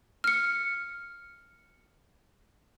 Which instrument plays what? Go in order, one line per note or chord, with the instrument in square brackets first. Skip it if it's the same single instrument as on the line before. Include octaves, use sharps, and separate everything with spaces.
[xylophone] F6 C#7